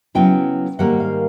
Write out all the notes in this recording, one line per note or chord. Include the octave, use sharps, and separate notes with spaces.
C#3 F#3 B3 E4 G5
G#2 D#3 G3 A#3 F#5
F5